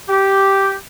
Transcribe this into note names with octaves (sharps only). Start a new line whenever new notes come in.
G4